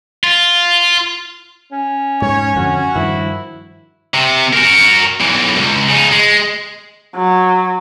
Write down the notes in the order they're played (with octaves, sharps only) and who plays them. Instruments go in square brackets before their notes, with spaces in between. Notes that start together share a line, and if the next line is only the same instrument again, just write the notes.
[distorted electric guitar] F4
[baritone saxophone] C#4
[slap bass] G#2 [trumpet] C#5
[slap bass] F2 D3 [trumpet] F#4
[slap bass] G2 D#3 F3 [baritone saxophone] E4
[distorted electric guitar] C3
F#4 A#4
B1 E3
C#2 G2
C#3 D#4
G#3
[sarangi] F#3